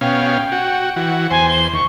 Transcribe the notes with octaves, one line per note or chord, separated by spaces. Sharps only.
B2 C#4 F5 G5
F#4
E3 F#4
E2 C5 G#5
G7
D#2 C#6